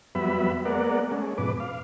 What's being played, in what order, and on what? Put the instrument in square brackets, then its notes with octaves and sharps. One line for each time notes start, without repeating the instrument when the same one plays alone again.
[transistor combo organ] F2 F#3 G3 B3 E5 B5
G#3 A#3 B3 A#4 D5 F#5
G#3 A3 C#4
F2 G#2 B2 B4 D6
F5